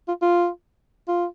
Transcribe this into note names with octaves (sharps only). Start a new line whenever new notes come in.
F4
F4
F4